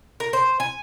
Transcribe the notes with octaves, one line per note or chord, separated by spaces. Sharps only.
A#4
C5
G#5